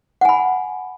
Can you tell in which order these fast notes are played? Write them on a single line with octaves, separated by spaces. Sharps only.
F#5 G#5 B5